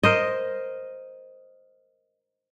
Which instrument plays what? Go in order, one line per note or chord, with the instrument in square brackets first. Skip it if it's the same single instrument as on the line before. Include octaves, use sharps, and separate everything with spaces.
[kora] A#4 C5 D#5